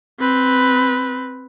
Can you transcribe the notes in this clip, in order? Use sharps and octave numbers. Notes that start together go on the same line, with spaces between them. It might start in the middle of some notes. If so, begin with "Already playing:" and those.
C4 B4